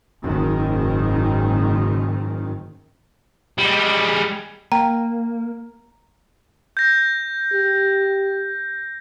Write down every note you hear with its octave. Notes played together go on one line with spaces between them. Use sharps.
F#1 G#2 D#3
G3 G#3
A#3 G5 A#5
G6 A#6
G4